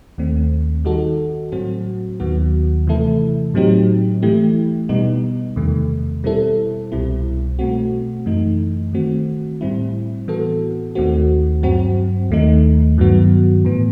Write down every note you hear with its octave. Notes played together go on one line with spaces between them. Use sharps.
D#2 D#3 A3 C4
D#3 G3 D#4 F#4 A4
A2 F#3 C4 F#4
D#2 D#3 F#3 B3 F#4
C3 E3 A3 E4 A4
A2 F#3 C4 D#4 G4
E3 A3 E4 G4
B2 G3 B3 D#4
E2 C3 D#3 A3
B2 G3 C4 E4 A4
C2 B2 G3 C4 E4
B2 A3 C4 F#4
F#2 E3 A3 D#4
D#3 A3 C4 F#4
A2 G3 C4 E4
A2 E3 B3 F#4 A4
D#2 D#3 A3 C4 F#4
G2 F#3 C4 F#4
D#2 D#3 A3 D#4
G2 D#3 F#3 B3 F#4
A2 E3 B3